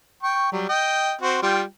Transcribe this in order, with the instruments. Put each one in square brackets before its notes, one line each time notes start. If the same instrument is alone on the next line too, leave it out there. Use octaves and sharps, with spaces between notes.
[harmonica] G5 C#6
F#3 G3
D#5 G5
C4 F#4
G3 F4 G5